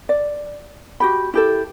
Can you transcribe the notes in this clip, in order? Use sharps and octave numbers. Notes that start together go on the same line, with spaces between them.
D5
F#4 G4 B5
E4 G4 A4